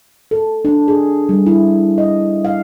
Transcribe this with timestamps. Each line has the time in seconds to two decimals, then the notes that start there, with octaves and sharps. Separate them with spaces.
0.31 A4
0.65 D4
0.88 G#4
1.29 G3
1.46 E4
1.98 D#5
2.45 F5